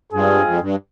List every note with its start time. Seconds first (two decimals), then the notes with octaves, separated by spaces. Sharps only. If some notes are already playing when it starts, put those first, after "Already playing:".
0.13 G2 G#3 C4 F4 G#4
0.45 F2
0.61 G2